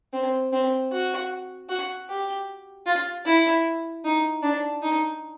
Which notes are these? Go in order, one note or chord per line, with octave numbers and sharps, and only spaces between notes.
C4
C4
F#4
F#4
G4
F4
E4
D#4
D4
D#4